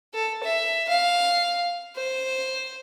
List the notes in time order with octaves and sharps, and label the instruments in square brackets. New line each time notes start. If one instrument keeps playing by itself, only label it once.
[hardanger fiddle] A4
E5
F5
C5